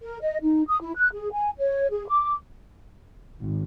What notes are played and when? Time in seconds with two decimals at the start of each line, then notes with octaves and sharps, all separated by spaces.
0.02 A#4
0.21 D#5
0.42 D#4
0.68 D#6
0.82 E4
0.96 F#6
1.13 G#4
1.32 G#5
1.59 C#5
1.92 G#4
2.08 D6
3.39 G#1